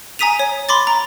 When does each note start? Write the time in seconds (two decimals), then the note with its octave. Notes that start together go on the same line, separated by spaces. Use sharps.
0.19 G#5 A#5 D#6 B6 D#7 F7
0.39 C#5
0.69 B5 C6 D6 A6
0.87 A#5